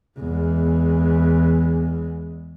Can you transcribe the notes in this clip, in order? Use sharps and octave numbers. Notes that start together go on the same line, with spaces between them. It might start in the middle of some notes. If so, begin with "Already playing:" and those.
E2 G#3